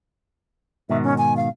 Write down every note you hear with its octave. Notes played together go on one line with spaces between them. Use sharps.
G#2 B2 D#3 E5
C#4
G#5
F5